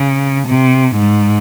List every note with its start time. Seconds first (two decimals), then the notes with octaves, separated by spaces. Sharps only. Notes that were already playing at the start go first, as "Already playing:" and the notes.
Already playing: C#3
0.48 C3
0.98 G#2